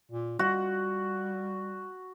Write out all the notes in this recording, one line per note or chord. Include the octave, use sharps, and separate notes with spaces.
A#2
G3 F#4